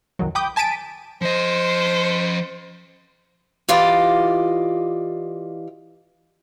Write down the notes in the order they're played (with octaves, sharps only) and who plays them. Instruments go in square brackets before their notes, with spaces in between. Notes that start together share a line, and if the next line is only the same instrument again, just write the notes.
[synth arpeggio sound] C2 F#2 D#3 F#3
G5 B5 D6 D#6 G6
G#5 A5 A6 B6 D7 D#7
[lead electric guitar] F3 D#5 [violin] C5
[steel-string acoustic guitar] E3 F4 G4 D5 D#5